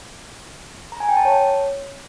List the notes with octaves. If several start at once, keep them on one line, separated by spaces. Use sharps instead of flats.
A#5
G#5
G5
A5
C#5